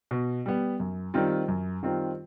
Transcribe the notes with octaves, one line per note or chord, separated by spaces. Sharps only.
B2
G3 B3
F#2
D#3 G3 C4 F4
F#2
D#3 G3 C4 F4